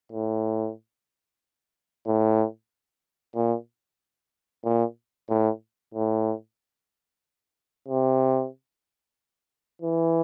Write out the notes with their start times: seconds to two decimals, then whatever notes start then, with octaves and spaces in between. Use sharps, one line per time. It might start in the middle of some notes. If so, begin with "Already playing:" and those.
0.12 A2
2.06 A2
3.35 A#2
4.65 A#2
5.30 A2
5.94 A2
7.89 C3
9.82 E3